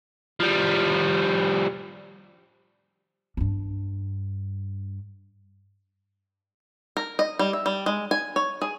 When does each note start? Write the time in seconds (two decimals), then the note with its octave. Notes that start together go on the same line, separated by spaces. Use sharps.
0.40 F3 G3
3.37 G2 D4
6.97 A#4
7.19 D#5
7.39 G3
7.53 E5
7.66 G3
7.86 G#3
8.11 G#5
8.36 C#5
8.62 G#4